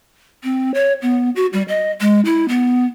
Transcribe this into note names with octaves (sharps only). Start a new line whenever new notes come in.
C4
C#5
B3
F#4
G3
D#5
G#3
E4
B3